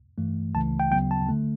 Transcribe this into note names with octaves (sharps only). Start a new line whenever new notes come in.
G2 E3 A3
C#2 C#3 E3 A3 A5
G5
D2 C#3 F#3 B3 G5
A5
D3 A3